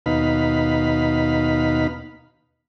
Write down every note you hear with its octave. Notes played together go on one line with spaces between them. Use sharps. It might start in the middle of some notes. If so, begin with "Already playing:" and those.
D#2 B2 D#4 F5 B5